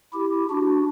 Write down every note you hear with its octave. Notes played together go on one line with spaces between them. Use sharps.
E4 G4
D4 F#4